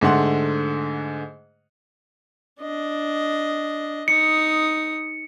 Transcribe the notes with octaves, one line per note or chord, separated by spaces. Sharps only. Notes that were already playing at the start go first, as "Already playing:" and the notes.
G#2 D3 A3 F#5 C6
D4 D#5
D#4 D#6 C#7